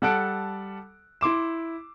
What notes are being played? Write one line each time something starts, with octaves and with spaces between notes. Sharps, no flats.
G3 A4 F#5 A5 F#6 D7
E4 C6 D6 E7